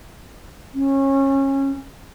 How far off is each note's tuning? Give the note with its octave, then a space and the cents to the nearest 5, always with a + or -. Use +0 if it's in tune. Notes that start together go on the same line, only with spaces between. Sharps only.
C#4 -25